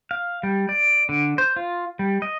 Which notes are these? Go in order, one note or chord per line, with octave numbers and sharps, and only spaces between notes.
F5
G3
D5
D3
C5
F4
G3
D#5